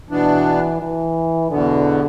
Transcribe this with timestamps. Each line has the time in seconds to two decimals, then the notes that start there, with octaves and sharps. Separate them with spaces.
0.10 B2 E3 B3 D4
0.80 E3
1.51 E2 B2 D3 B3